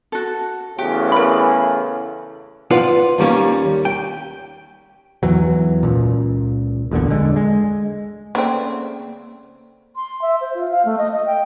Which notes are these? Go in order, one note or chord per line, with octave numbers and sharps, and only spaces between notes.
F#4 A4
E2 C#3 A3 F#4 G4
A#4 B5
F4 B4 C5 D5 F#5
D#2 D#3 G3 A#3 C#4
G5
E2 E3 F#3
C#2 A#2
A1 E2 A#2 D3
D3 G#3
G#3
C#3 A3 A#3 C4 D5
C6
E5
C5
F4
F5
A3
D#5
D#5
G5